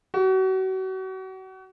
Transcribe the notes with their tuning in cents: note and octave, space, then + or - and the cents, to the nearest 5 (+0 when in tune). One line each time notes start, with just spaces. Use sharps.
F#4 +35